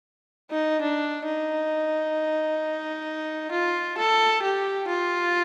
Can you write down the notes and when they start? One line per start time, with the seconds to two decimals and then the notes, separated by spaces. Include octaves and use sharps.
0.51 D#4
0.81 D4
1.26 D#4
3.52 F4
3.98 A4
4.43 G4
4.88 F4